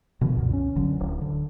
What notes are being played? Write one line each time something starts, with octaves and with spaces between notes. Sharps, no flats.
B2 D3 D#3 F3
C#2 F#2 A#2
C#4
G1 D3 F#3
D1
D3